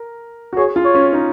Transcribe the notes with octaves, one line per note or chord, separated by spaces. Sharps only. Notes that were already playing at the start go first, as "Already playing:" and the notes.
Already playing: A#4
F#4
G#4 C#5
F4
C#5
C#4
D#4